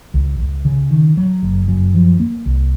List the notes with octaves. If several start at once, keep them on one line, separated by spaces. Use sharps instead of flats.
C#2
C#2
C#3
D#3
F#3
F#1
F#2
F3
A#3
C2